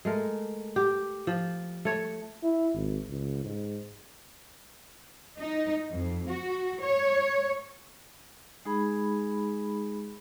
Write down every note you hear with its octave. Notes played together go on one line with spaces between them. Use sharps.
G#3 A3 A#4
G4
F3
A3 C#5
E4
G#1
C#2
G#2
D#4
F2
F#4
C#5
G#3 D#4 G#4 B5